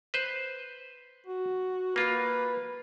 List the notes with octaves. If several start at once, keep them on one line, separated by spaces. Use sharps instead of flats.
B4 C5
F#4
A#3 F4 B4